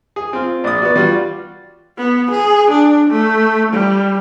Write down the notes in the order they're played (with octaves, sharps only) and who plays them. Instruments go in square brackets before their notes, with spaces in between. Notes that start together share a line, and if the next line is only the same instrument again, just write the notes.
[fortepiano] G#4
C4 F4
[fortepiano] A#1 D#6 [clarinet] D5
[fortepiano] B3 F#4
G3 F4 F#4
[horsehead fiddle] B3
G#4
D4
A3
G3